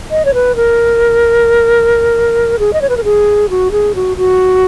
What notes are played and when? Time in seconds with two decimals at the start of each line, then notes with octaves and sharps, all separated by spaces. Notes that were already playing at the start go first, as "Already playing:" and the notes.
0.11 D#5
0.25 C#5
0.34 B4
0.56 A#4
2.59 G#4
2.73 D#5
2.81 C#5
2.89 B4
2.97 A#4
3.04 G#4
3.49 F#4
3.71 G#4
3.95 F#4
4.17 F#4